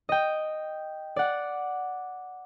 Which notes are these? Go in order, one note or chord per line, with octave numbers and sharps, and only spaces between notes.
D#5 G5
D5 F#5